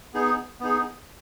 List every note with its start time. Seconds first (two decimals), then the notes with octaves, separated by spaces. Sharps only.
0.14 B3 D#4 G#4
0.60 B3 D#4 G#4